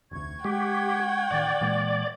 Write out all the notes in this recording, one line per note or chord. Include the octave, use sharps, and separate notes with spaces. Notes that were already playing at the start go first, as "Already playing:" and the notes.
F1 D2 C#6 G#6
G#3 G4 F#5 G5
A1 D#3 D5
A#2 E3 G#3